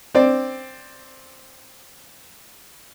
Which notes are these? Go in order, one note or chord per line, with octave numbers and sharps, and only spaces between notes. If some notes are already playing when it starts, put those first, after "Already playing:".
C4 D5